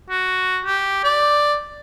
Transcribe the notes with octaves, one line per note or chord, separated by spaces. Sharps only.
F#4
G4
D5